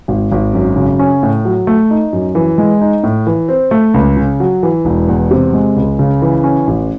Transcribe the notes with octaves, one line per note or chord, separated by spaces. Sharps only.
G#1
G#1
F#2
C#3
C#4
A2
F#3
A3
D#4
F#2
E3
G#3
D#4
A2
E3
C4
A3
C#2
C#3
F#3
E3
E1
E2
C3
G#3
C#2
C#3
E3
C#4
A1